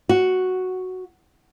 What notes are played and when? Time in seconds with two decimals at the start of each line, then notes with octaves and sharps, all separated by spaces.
0.09 F#4